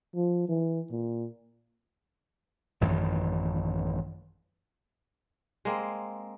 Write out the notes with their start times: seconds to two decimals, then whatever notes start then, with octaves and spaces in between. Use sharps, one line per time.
0.15 F3
0.48 E3
0.91 A#2
2.81 A1 F#2 D#3 E3
5.65 G#3 A#3 C4